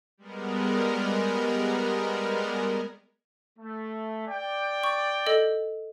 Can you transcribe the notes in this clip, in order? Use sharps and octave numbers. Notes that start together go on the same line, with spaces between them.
G3 G#3 B3 A#4
A3
D5 G5
C#6
A4 D#5